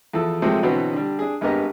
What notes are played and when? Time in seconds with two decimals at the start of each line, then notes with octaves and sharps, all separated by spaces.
0.13 E2 F3 A4
0.42 C3 F3 F#3 G#3 A3 C4
0.63 B2 D3 E3 F#3 B3 C4
0.93 D3 G3
1.19 D4 G#4
1.41 G#1 G2 B3 G4 A#4 D#5